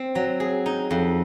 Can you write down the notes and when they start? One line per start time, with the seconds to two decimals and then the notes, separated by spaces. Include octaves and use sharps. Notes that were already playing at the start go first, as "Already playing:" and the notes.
Already playing: C4
0.15 F#3
0.40 G#4
0.66 D#4
0.91 F2